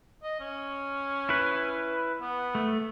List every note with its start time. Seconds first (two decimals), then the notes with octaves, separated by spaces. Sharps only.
0.23 D#5
0.40 C#4
1.29 E4 B4
2.22 B3
2.55 A3